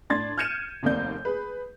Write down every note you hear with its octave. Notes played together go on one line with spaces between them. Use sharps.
A2 D4 C6 G#6 A6
F6 G6 G#6 C#7 D#7 E7
F1 D#2 A#3 C4 D5 G6
G#4 B4